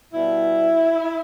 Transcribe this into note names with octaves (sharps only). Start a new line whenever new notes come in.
B2 G3 E4